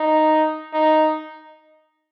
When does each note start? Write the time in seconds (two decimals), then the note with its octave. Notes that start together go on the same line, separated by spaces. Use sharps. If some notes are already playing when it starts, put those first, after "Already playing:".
Already playing: D#4
0.74 D#4